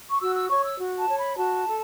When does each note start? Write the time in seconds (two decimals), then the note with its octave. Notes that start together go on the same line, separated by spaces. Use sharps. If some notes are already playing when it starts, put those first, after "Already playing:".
0.10 C#6
0.20 F#4 E6
0.35 E6
0.49 C#5 C#6
0.64 E6
0.79 F#4
0.98 A5
1.09 C#5
1.18 B5
1.37 F#4 A5
1.67 A4